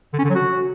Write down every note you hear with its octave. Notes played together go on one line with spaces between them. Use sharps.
D3
C#4
D3
F#3
F#4